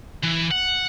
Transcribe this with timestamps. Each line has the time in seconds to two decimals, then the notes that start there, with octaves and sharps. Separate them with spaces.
0.23 E3
0.51 F#5